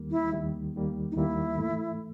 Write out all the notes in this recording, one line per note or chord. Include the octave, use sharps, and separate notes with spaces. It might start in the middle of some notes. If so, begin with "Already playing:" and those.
Already playing: D#2 D#3 G3 A#3
E4
D#2 D#3 G3 A#3
D#2 D#3 G3 A#3
D#4
D#2 D#3 G3 A#3 E4
G#2 E3 A3